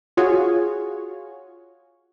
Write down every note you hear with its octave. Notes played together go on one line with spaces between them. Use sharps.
F4 F#4 G#4 C#5